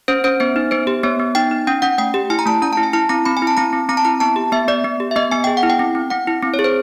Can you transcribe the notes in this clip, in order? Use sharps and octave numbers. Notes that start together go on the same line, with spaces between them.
C#4 C5
C#4 C5
B3 C5
D#4
B3 C5
G4
B3 C#5
B3
D#4 G5
D#4
C#4 G5
C#4 F#5
A3 G5
G4
E4 G#5
A#5
A3 A5
C#4 A#5
A5
E4
G#5
E4 A5
C4 A#5
C4 B5
G#5
E4
A5
C4 A#5
C4
C4 A#5
A5
E4 A#5
B3 A5
G4
B3 E5
B3 D5
B3
G4
E5
B3 D#5
B3 G#5
G#4 G5
F#5
E4
G5
C4
C4
C4 F#5
E4
C4
C#5
G#4
C5